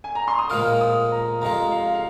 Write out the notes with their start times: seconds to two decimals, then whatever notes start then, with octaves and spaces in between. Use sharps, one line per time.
0.04 G#5
0.15 A#5
0.28 C6
0.39 D#6
0.50 A#2 F3 G#3 F4 A#4 F6
0.81 D#6
1.11 A#5
1.41 F2 C3 G#3 F4 A#5
1.72 F5
1.94 F5